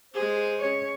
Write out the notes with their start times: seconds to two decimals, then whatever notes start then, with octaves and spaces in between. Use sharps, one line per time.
0.14 G#3 G#4 C5
0.59 C#4 C#5